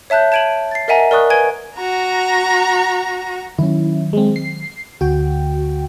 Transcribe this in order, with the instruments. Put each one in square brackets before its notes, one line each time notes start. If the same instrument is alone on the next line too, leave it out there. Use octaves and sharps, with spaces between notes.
[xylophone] C#5 E5 A5 F#6 G6
A5 G#6 D7 D#7 F#7
A6 C7
A#4 D#5 E5 F#5 G#5 A#5
A#4 D5 C#6 D#6 F#6
B4 G#5 G#6 D7 G7
[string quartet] F#4 A#5
[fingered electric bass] D#3 F#3 [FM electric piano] C#4 E4
[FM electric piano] G#3 C4
C7
[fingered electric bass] D2 [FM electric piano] F#4 G5